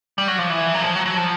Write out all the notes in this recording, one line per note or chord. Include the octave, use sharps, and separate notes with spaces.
G3
F#3
F3
E3
F#3
F3
F#3
F#3
F3